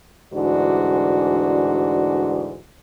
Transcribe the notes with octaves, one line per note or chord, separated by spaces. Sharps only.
D2 G#2 E3 D4 F#4 D5